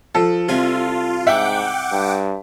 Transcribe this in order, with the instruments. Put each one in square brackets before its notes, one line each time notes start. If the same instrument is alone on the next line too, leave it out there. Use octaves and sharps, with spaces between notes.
[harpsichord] F3 [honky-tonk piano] A4
[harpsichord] C2 C3 G#5 [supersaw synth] F4
[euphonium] G#2 [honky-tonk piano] E5 [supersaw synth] F#5 G5 D6
[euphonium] G2